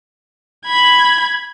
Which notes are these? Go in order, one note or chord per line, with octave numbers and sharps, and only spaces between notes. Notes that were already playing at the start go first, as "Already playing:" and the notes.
B5 G#6